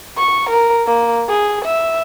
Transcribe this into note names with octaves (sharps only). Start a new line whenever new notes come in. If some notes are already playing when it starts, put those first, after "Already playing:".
C#6
A#4
A#3
G#4
E5